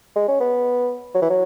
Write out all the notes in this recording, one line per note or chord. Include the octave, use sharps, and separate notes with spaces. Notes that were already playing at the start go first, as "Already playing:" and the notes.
G#3
C#4
B3
F#3
E3
F#3